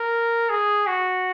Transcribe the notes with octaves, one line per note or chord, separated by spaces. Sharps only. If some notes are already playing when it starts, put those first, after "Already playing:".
Already playing: A#4
G#4
F#4